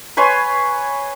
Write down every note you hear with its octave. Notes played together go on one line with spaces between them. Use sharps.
B4 C#5 G#5 C6